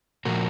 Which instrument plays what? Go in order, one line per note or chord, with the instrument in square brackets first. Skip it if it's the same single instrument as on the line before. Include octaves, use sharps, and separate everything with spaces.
[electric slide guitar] A#2 F3 F#4 A#4